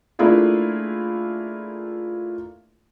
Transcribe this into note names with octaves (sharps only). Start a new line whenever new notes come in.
A3 A#3 D4 E4 F4 G#4